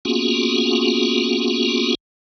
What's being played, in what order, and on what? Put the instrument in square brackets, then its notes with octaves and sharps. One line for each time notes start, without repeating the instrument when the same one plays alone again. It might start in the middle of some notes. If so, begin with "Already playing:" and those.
[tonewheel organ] A#3 B3 C#4 F4 F#4 G#4